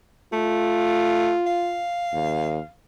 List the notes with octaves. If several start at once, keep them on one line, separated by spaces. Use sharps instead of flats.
A3 F4
F5
D#2